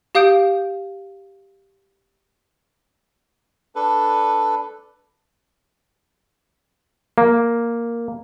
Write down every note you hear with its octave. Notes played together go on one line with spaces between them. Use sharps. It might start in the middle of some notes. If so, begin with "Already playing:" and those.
G4 F5 D#6 G6 D7
D4 A4 B4
A#3